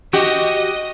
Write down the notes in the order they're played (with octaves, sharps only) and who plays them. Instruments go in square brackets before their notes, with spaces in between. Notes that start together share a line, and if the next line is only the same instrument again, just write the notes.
[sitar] F#4 G4 [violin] D#5